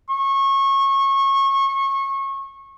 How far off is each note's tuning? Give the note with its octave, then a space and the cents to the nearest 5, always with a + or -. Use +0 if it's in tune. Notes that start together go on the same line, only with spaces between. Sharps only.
C#6 -25